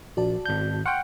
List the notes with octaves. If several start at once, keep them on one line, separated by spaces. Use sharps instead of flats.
A#1 F#4 D5 A5
G#1 G6
F#5 G5 C6 C#6 F6